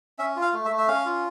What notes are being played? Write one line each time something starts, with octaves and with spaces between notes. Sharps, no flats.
C#4 E5
F4
F5
A3
E5
A3
E5
C#4 F5
F4